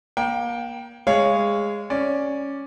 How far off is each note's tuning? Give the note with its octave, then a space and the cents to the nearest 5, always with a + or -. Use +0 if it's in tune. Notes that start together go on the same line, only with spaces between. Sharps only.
A#3 +30 G5 -10
G#3 -15 C#5 +0 F5 -20
C#4 +0 D5 +0